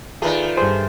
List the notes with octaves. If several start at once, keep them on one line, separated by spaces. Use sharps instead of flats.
D#3 A3 F4 G#4 B4 D5
G2 G#4 C5